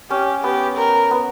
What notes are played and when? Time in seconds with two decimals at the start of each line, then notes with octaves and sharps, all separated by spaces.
0.10 C#4 G4
0.43 B3 G4
0.78 A#4
1.11 B3